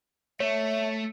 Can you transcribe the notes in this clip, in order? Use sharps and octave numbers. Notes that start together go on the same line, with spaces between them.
A3 C#5 E5